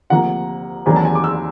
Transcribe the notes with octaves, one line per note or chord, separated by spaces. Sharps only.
D2 C3 F3 A#3 F#5
E2 C3 D#3 F#3 A#3 G#5
A5
G#5
D6
E6